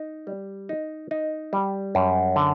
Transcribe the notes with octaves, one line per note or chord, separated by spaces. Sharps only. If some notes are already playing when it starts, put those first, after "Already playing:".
Already playing: D#4
G3
D#4
D#4
G3
F#2
D3